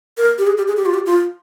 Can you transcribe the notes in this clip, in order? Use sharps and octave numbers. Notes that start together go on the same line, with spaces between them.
A#4
G4
G#4
G4
G#4
G4
F4
G4
F4